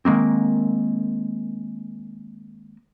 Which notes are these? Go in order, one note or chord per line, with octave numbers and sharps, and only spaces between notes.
D#3 G#3 A#3 C4